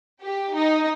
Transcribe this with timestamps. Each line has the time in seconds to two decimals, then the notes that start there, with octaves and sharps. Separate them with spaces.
0.23 G4
0.54 D#4